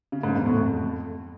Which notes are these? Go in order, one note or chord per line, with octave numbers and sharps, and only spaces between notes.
C#3
G#2
E2
A2
F2